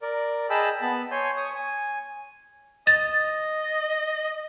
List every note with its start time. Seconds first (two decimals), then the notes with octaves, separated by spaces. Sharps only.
0.02 A#4 D5
0.50 G#4 D#5 G5 A5 B5 E6
0.82 B3 A5 B5
1.11 C#5 G#5 C6 G6
1.37 C#5 C#6 D#6
1.55 G#5
2.87 D#5 A6